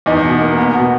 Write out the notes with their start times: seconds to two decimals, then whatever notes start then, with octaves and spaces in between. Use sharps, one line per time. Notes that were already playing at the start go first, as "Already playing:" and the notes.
0.06 E2 D#4
0.24 B2
0.41 A#3
0.58 B3
0.74 B2